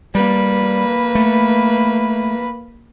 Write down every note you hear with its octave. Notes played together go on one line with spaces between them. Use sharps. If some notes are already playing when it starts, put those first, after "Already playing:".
G3 A#3 B4
A3